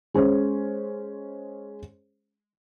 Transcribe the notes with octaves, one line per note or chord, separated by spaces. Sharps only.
G#3 C#4 C5